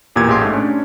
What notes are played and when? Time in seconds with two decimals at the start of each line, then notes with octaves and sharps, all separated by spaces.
0.16 E2 A#2 G4 G#6
0.28 A1 G4 G#4 C6 D6
0.41 G#2 A3
0.53 C#4 D4